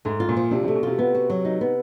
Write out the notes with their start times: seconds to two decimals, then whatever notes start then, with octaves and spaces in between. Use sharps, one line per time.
0.05 G#2 A3
0.20 F4
0.29 A#2
0.37 F3
0.51 C3 D4
0.64 C3 A3
0.75 B2
0.83 C3 F4
0.98 C3 B3
1.15 F#4
1.30 F#3
1.45 D#4
1.61 B3